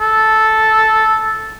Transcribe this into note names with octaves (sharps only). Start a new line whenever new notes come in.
A4